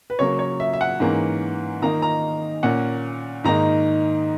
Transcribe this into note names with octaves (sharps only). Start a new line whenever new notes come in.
B4
C#3 F#3 A#3 C#5
C#5
E5
E5
F#5
G#2 E3 A#3 C#4
D#3 A#3 D#4 A#5
A#5
A#2 A#3 C#4 F#5
G#2 D#3 A#3 D#4 A#5